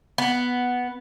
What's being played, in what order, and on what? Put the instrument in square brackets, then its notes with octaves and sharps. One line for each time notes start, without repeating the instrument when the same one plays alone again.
[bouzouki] B3